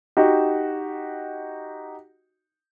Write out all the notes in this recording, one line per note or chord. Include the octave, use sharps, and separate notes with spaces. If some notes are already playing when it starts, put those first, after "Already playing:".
D#4 F#4 G4